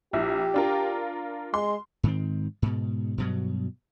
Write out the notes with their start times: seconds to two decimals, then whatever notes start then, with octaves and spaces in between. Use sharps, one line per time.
0.13 A#1 E4 G4
0.54 D4 F4 A#4
1.54 G#3 C6
2.03 G#2 D#3 C4
2.62 G#2 B2
3.18 G2 B2 F#3